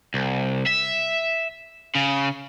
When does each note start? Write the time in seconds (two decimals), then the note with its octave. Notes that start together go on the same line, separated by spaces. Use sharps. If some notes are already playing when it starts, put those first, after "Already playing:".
0.14 C2
0.67 E5
1.95 C#3